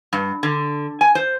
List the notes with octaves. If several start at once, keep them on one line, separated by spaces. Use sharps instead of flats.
G2
D3
G#5
C5